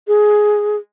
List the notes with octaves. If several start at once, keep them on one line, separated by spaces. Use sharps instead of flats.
G#4